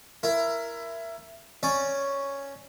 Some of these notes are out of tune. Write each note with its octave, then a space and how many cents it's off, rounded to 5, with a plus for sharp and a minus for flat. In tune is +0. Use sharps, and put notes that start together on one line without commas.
E4 +20 A#4 +0
C#4 +0 D5 +0